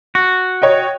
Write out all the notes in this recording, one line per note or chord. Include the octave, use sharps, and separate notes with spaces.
F#4
C#5 D#5 G5